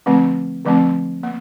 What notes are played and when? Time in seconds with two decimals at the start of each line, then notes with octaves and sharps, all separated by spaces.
0.06 D3 F3 A3 C4
0.65 D3 F3 A3 C4
1.23 A#3